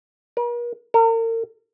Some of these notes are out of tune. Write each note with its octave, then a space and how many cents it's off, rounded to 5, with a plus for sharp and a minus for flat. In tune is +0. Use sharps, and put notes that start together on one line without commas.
A#4 +45
A#4 -40